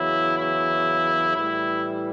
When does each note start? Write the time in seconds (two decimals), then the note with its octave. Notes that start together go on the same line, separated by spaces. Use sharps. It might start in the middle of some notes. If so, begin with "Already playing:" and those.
Already playing: E2 C#3 F#3 E4
0.38 E4
1.36 A2 E3 G3 E4